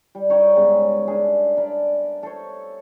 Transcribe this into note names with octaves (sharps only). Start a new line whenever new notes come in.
G3
D#4 C#5 D#5 G5
G#2 C#3 B3 E5
D4 G4 G#4 A#4
A#4 D5 A5 B5
A4 C5 C#5